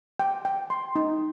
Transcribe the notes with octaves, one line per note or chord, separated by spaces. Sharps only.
G5
G5
C6
D#4